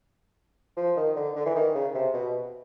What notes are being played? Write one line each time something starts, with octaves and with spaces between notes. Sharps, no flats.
F3
D#3
D3
D3
E3
D#3
C#3
C3
B2